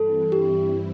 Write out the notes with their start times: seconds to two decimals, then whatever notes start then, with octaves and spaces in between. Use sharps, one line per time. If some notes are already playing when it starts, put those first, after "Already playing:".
Already playing: G2 E3 G3 C4 E4 A4
0.32 G4